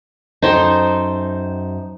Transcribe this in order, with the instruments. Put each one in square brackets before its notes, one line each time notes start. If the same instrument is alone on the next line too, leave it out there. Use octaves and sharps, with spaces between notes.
[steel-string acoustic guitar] F#2 C5 G5 [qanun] D#4 A4